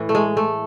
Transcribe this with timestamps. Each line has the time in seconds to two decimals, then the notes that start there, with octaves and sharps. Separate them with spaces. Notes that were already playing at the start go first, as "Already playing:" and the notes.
Already playing: A2 E3
0.09 A3
0.15 G#3
0.37 A3